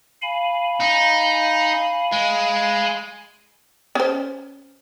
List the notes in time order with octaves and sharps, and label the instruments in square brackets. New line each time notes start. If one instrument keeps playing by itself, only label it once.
[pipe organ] F5 G#5 B5
[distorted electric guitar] D#4
G#3
[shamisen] C#4 C5